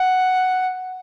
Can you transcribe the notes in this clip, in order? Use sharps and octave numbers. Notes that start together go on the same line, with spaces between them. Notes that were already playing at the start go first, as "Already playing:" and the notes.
Already playing: F#5